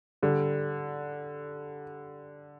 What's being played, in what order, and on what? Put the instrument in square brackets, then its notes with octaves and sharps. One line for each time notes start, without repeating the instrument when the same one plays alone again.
[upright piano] D3 G3